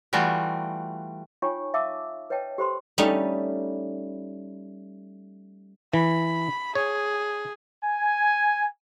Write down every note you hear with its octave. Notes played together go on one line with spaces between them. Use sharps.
E3 G3 A3 F4 F#4
D#4 F4 C#5 G5 G#5 C#6
E5 F5 A5 D6 E6
B4 C#5 D#5 G5 A5
G4 A4 C5 B5 C6
G3 A3 C#4 D#4
E3 B5
G#4 C#5
G#5